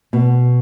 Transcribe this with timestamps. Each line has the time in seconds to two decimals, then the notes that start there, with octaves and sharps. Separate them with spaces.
0.13 B2